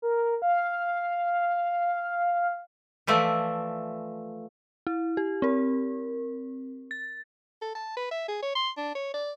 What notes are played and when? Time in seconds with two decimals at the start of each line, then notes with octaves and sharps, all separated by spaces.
0.02 A#4
0.42 F5
3.07 E3 F3 A3 E4 D5
4.87 E4
5.17 G4
5.42 C4 A#4
6.91 A6
7.61 A4
7.75 A5
7.96 B4
8.11 E5
8.28 G#4
8.42 C#5
8.55 C6
8.77 D4
8.95 C#5
9.14 D5